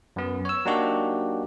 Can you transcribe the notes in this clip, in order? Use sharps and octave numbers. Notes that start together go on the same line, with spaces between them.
F#2 B3
C#5 E6
F#3 A#3 D4 D#4 F#4 G4